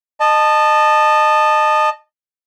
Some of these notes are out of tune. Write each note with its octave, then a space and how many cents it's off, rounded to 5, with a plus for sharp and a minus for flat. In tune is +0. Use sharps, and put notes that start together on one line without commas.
D#5 -25 A5 +0